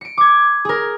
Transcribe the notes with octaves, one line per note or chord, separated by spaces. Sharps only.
C#7 D7
D6 G#6
G#4 A#4